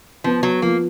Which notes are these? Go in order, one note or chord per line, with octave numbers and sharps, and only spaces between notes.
F3 B3
F#3
F3 A#3